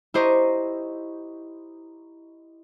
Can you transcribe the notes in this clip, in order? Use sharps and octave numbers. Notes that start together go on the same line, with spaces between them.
E4 G4 C5 D#5 A#5 C#6